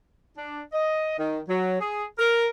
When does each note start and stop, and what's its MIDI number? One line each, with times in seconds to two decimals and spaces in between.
0.37 0.62 62
0.73 1.16 75
1.18 1.39 51
1.48 1.79 54
1.80 2.04 68
2.18 2.46 70